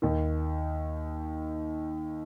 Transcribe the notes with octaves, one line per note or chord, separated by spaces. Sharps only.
D#2 D#3